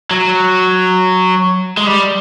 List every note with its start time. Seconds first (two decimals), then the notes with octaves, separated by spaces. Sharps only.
0.11 F#3
1.77 G#3
1.87 G3